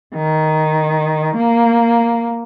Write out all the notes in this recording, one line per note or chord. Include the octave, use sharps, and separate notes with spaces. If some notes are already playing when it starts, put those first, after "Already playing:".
D#3
A#3